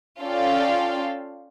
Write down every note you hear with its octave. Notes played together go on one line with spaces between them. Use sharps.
C#4 F4 A4 D5 F5 G5